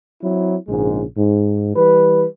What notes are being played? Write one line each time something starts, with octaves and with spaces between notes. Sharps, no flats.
F#3 C4 E4
A#1 G#2 C#3 G#3
G#2
E3 G3 B4